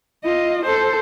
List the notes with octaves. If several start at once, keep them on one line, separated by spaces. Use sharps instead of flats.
F4 D#5
A4 C5